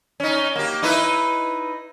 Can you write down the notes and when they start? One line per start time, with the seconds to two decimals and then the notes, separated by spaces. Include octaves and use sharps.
0.20 C#4 D#4
0.56 A#3 G4
0.82 D#4 E4 B4